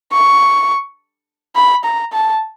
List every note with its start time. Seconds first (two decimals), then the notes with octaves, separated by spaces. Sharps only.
0.12 C#6
1.55 B5
1.84 A#5
2.12 A5